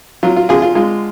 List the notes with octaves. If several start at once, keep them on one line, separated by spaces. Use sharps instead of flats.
F#3 F4
F4
D3 F4 G#4
F4
G#3 F4